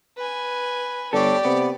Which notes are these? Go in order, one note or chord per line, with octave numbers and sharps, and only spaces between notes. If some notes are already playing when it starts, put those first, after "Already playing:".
B4 G#5
G1 G4 A4 C#5 D5
C3 B3